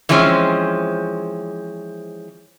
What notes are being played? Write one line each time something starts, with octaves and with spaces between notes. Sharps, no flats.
E3 F3 G#3 C4 C#4